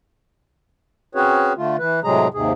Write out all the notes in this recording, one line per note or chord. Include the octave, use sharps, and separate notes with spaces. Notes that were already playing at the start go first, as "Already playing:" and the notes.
C4 C#4 F#4 G#4 B4 C#5
D3 A3 F4
E3 B4
A2 C3 F#3 G#3 G#4 A#5
D#2 G#2 C3 G#4